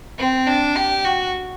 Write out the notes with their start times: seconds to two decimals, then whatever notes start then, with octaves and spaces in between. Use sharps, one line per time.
0.18 C4
0.47 D4
0.76 G4
1.04 F#4